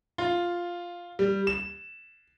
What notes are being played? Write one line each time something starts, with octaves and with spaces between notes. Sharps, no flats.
F4
G3
E7